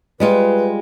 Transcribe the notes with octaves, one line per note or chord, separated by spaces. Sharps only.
G3 G#3 F4 B4